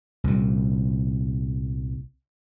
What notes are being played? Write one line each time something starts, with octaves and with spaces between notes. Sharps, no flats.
C2 A#2